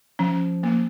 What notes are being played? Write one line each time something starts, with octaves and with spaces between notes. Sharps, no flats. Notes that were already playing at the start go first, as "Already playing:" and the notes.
F3 C#4
A#3